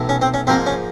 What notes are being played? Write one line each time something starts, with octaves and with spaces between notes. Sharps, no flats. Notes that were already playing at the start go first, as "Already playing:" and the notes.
Already playing: B1 A2 E3
C#4
C4
C#4
G#2 F3 A#3 C4
C#4